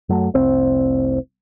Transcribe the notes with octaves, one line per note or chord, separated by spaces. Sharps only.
F#2 F#3 A3
F1 C2 C4